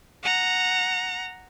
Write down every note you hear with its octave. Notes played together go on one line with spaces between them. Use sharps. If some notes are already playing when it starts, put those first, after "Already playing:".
F#5 A#5